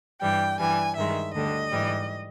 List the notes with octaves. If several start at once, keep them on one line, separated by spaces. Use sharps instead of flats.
G2 E3 G3 G5
G2 E3 G3 G#5
G2 D#3 G#3 E5
D2 D3 G3 D#5
G#2 E3 G3